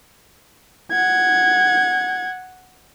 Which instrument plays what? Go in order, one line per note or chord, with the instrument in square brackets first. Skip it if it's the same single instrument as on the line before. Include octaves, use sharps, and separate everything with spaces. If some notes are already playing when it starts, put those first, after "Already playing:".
[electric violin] F#5 G#6